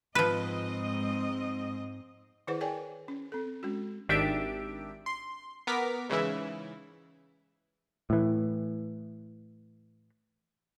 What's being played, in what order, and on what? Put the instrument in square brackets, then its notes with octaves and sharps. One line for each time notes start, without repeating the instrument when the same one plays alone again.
[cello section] G#2 C4 D#5 [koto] F3 B4
[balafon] D#3 E4 G#4 B4 C5 F#5
G#4 A#4 C#5 D5 G5 G#5
C#4
C4 A4
G#3 C#4 F#4
[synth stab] G#1 D#3 D4 G4 E5 D7
C6
B3 A#4 D6 B6
G#2 C#3 E3 E4
[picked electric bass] A2 E3